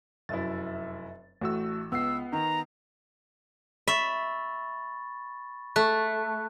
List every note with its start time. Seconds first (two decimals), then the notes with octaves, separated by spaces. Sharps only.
0.29 F1 F#2 E4 E5 A6
1.41 A1 A3 F#4 E6
1.92 C#2 B3 E6 C7
2.33 D#3 A#5
3.87 E5 B5 C#6 A6
5.76 A3 F#6